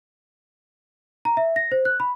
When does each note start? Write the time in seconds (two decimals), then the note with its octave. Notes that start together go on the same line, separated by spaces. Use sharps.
1.25 A#5
1.37 E5
1.56 A#6
1.72 C5
1.85 F#6
2.00 B5